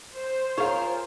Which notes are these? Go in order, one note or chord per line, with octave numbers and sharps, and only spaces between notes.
C5
F4 G#4 A#4 C#5 F5